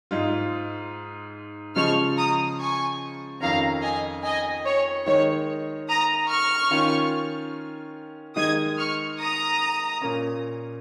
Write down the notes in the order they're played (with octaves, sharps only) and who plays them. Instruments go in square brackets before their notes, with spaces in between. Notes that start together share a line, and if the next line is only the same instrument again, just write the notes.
[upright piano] G#2 G#3 F4
[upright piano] C#3 F3 G#3 [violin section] C#6 F6
[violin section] A#5 D#6
G#5 C#6
[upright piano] F2 D#3 C#4 [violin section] F5 A#5
[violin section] D#5 G#5
D#5 G#5
C#5
[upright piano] D#3 G#3 D#4 [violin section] C#5
[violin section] A#5 D#6
C#6 F6
[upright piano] D#3 C#4 F4
[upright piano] D#3 G#3 D#4 [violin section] D#6 G#6
[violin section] C#6 F6
A#5 D#6
[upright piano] A#2 A#3 C#4